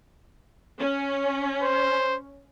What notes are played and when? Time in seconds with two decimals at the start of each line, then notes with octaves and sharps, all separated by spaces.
0.79 C#4
1.62 C5